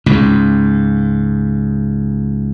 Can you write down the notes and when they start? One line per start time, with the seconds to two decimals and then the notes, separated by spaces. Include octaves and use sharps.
0.06 C#2 G#2